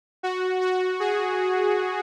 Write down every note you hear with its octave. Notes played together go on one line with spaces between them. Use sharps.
F#4
F#4
G#4